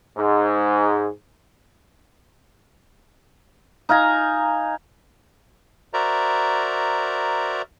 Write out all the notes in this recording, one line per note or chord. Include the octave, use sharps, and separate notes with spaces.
G#2
D#4 F5 G#5 A#5
F#4 A#4 C5 D5 E5 A#5